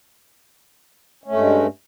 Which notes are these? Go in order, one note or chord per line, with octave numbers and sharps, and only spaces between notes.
G2 G#3 A3 C#4